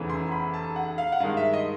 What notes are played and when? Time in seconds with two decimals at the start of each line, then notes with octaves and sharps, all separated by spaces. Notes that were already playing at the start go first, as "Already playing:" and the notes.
Already playing: F1 E2 C#3 E3
0.10 C6
0.32 B5
0.54 A5
0.76 F#5
0.98 F5
1.12 F#5
1.20 G2 D#3 G#3 F5
1.37 E5
1.54 D#5